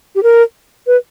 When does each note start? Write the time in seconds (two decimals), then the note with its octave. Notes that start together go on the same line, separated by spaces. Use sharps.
0.15 G4
0.23 A#4
0.87 B4